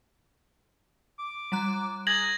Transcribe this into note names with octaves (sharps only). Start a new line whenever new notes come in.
D6
G3 A#5 F#6
G#4 G#6 A#6 F#7